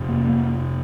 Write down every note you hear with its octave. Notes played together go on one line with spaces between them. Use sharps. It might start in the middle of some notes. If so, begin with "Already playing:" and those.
Already playing: F2 C3
A#3
A#3